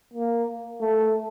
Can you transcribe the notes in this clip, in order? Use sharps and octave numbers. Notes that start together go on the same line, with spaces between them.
A#3
A3